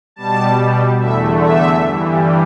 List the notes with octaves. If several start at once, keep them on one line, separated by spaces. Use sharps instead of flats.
B2 G3 A5
E2 D3 A3 E5
E5
G2 E3 G3